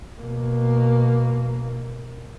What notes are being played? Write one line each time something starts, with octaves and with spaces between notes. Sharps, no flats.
B2 A#3